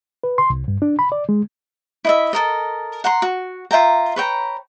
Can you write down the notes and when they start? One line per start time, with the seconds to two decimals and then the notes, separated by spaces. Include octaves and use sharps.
0.24 B4
0.38 C6
0.50 C2
0.68 G2
0.82 D4
0.99 B5
1.12 D5
1.29 G#3
2.05 E4 D#5 E5
2.33 A4 A#4 D#5
3.04 F#5 A#5 C6
3.22 F#4
3.71 F4 E5 G5 A#5
4.16 B4 C#5 G5 A#5